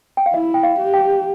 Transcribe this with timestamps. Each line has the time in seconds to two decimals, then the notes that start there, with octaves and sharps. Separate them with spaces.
0.17 G5
0.26 F5
0.34 E4 E5
0.54 G5
0.63 F5
0.79 G4
0.94 G5